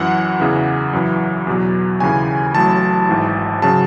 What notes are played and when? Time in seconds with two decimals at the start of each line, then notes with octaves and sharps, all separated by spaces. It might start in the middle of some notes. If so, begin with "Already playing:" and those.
Already playing: F#2 E3 F#5
0.40 E2 C#3 E3
0.93 F#2 E3
1.47 E2 B2 F#3
2.00 D#2 C#3 E3 G#5
2.55 A1 A2 F#3 A5
3.09 G#1 G#2 E3
3.62 C#3 F#3 A5